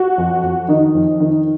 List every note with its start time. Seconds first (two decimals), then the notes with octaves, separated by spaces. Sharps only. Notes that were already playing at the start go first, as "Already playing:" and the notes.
Already playing: F#4
0.18 F2
0.43 F2
0.68 D#3 D#4
0.95 F2
1.20 D#3